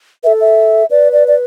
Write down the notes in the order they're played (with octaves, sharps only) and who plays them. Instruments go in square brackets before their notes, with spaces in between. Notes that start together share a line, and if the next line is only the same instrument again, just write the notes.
[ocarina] A4 B4 [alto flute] E5
[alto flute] E5
[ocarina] B4 [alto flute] D5
[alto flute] D5
D5